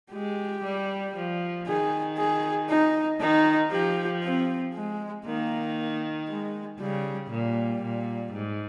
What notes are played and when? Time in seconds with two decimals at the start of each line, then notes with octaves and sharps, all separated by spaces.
0.12 G#3 G4
0.63 G3
1.15 F3
1.67 D#3 G#4
2.18 G#4
2.69 D#4
3.20 D#3 D#4
3.72 F3 G4
4.23 C4
4.74 G#3
5.26 D#3 A#3
6.28 G#3
6.79 C#3 G3
7.30 A#2 G3
7.82 A#2
8.33 G#2